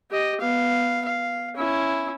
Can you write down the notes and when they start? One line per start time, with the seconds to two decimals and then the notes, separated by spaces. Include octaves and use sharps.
0.11 G4 D#5
0.41 B3 F5
1.05 F5
1.56 C#4 E4